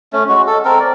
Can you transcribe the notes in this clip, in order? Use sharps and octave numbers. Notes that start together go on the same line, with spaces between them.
A3 C#4
G#3 F#4
A4
C4 A4 A#4
D5